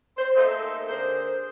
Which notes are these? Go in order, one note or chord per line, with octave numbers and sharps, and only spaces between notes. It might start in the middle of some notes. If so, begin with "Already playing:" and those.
C5
A3 A#3 C4 D#4 G#4 A4
D3 G#4 A#4 C5